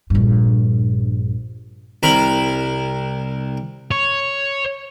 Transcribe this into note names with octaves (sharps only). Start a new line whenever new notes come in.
A#1 G2
C2 A#4 B5
C#5